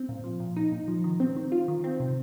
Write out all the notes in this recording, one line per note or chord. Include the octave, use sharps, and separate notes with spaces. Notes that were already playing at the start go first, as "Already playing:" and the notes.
Already playing: C4
A#2
F3
A#2
D#4
A#2
F3
D#3
C4
D#3
F4
D#3
C4
C3